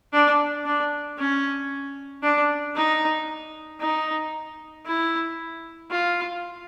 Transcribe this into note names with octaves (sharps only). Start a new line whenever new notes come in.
D4
D4
C#4
D4
D#4
D#4
E4
F4